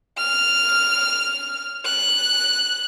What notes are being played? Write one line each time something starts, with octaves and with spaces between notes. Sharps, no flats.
F6
F#6